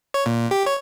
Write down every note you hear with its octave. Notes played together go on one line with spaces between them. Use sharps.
C#5
A#2
G4
C#5